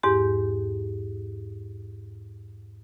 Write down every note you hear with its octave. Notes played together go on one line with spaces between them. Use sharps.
E2 G#2 G4